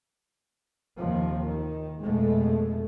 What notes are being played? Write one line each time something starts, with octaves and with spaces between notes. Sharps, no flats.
D#2 C3 F3
D#3
F1 F2 B2 G#3 A3